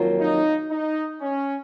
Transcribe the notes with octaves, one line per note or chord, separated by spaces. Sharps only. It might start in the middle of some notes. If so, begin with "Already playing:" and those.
Already playing: F2 D#3 F#3 A#3 F4
D#4
D#4
C#4